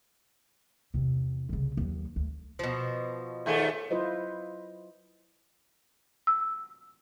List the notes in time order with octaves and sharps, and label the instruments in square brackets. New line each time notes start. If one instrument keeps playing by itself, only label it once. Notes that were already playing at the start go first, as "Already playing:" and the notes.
[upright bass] E2 C3
C2 C#3
D#2 F#3
D2
[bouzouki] B2 F3
[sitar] D#2 A3 G#4
[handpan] F#3 E4 F4 B4 C5 D#5
[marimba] E6